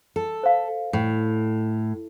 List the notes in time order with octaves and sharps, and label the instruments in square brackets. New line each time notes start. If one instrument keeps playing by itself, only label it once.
[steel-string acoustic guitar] A4
[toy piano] C5 F5
[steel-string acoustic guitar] A2